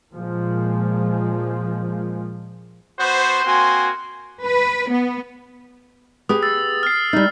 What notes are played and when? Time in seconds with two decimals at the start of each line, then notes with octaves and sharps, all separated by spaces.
0.12 A#2 F3 G#3
2.99 B3 F#4 C5
3.44 A#3 C4 F#4 G#5 C6
4.45 B4
4.92 B3
6.29 B3 G4 G#4 D#6
6.43 E6 A6
6.83 F6 C7
7.13 G3 D#4